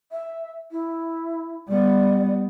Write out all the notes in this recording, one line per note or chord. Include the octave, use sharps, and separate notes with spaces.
E5
E4
G3 B3 D5